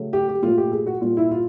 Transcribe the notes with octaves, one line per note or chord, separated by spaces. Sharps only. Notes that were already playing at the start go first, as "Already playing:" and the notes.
Already playing: C#3 F#3 A3
G4
G4
A#2 F#3 A3 F4
G4
G#4
F#4
A#2 G3 F4
E4
F4